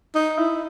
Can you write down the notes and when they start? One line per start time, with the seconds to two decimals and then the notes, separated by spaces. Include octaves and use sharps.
0.15 D#4
0.38 E4